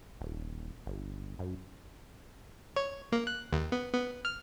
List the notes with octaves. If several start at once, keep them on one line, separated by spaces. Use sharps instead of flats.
D#1
G1
F#2
C#5
A#3
F#6
D#2
B3
B3
F6